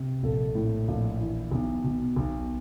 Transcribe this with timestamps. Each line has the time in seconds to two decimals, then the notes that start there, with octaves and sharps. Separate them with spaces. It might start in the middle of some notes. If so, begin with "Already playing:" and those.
Already playing: C3
0.23 A#1 A4
0.55 A2
0.88 A#1
1.20 E3
1.51 B1
1.84 B2
2.16 B1